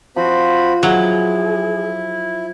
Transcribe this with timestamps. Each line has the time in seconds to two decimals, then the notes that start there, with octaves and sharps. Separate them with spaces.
0.16 F3 C4 F#4 B5
0.83 F#3 E4 G#4